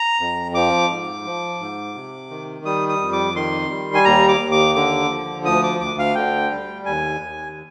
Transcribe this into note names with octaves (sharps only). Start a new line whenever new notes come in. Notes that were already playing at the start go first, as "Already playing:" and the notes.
Already playing: A#5
F2
F3 D6
G#2
F3
G#2
C3
D#3
G3 D#6
D#6
F2
D6
D#3 C6
G3
G#5
D#2 A#5
D6
D#2
D6
D3 D6
F3
D2 D#6
D6
D2 D6
F5
D3 G5
G3
D#2 G#5
D#2